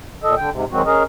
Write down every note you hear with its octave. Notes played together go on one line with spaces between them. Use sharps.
A#2 A4 D#5
D3 G5
G#2 C3
D#3 F#3 G#3 C4 F#4
C#4 G#4 A#4 D#5